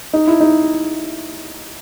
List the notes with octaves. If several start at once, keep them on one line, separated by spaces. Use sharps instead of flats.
D#4
E4
D#4